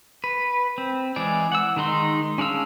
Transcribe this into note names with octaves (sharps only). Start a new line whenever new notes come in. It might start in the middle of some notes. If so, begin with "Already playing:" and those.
B4
C4
E3 G#3 G#4 D5
F#5 E6
D#3 G#3 D#4 C6
C#4 D4 G#4 F5 E6